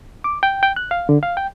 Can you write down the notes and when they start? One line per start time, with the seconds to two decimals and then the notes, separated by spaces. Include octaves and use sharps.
0.24 D6
0.43 G5
0.63 G5
0.76 F#6
0.91 F5
1.09 D3
1.23 F5
1.37 G5